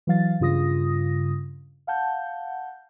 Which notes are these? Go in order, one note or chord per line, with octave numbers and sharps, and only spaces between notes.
E3 F#3 F5 A6
G2 C#3 F4 D#6 A#6
F5 F#5 A5 G6